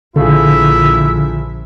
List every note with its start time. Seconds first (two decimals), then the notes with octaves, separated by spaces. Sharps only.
0.16 A#1 D3 A3 E4 F4 G#4 E5